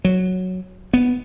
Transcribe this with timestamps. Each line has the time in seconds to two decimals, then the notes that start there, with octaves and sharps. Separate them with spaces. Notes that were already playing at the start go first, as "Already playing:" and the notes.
0.05 F#3
0.93 B3